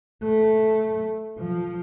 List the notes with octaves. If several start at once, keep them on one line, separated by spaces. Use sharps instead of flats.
A3
F3